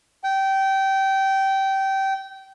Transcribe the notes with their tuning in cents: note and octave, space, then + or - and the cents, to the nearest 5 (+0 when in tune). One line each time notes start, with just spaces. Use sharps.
G5 -20